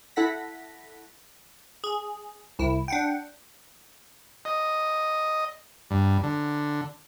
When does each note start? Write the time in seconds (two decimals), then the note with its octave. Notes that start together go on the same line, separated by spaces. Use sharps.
0.16 E4 A4 F#5 A#6 B6
1.84 G#4
2.59 C2 E4
2.88 D4 F#5 G5
4.45 D#5
5.91 G2
6.23 D3